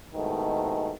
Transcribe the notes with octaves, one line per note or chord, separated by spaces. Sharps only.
C2 G#2 B2 D#3 A3